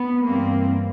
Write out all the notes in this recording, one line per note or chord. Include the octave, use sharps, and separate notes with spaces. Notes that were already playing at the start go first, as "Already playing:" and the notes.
Already playing: B3
G2 E3 G3 A#3 C4